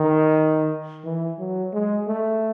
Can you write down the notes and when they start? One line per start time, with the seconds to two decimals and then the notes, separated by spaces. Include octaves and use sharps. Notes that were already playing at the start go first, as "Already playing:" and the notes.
Already playing: D#3
1.04 E3
1.39 F#3
1.74 G#3
2.07 A3